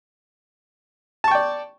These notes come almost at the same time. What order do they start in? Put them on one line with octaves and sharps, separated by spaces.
A5 C#6 G5 D5